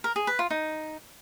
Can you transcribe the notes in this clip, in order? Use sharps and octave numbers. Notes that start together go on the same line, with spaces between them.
A#4
G#4
B4
F4
D#4